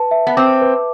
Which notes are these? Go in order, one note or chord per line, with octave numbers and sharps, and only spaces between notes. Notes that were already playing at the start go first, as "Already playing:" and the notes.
Already playing: B4 A5
E5
B3
C4 D6
B4